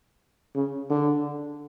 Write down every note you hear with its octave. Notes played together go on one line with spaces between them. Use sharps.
C#3
D3